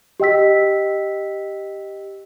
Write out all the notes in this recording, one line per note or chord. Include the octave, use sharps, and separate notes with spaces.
G4 D#5 G5 E6 B6